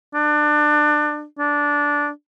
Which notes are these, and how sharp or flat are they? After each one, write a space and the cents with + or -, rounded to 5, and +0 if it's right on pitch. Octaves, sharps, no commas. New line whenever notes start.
D4 +25
D4 -10